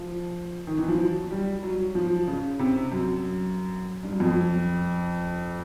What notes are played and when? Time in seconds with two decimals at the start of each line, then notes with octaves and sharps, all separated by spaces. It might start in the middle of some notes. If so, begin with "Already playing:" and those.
Already playing: F3
0.67 D#3
0.77 E3
0.88 F3
0.98 F#3
1.31 G3
1.63 F#3
1.95 F3
2.27 C#3
2.59 C3
2.92 F#2
4.03 G2
4.12 F#2
4.20 F2